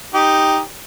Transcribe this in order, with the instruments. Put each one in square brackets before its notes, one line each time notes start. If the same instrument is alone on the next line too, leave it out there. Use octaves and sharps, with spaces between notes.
[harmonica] D#4 G4